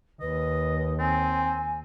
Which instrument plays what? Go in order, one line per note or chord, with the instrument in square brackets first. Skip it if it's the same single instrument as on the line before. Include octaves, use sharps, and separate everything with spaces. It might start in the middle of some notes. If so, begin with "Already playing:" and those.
[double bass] D#2 [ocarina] B4 [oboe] D#5
[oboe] C4 [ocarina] G#5